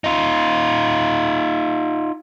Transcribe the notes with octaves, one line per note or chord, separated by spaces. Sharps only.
D#4 F4